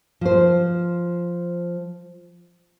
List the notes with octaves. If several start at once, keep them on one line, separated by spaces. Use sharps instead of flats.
F3 C5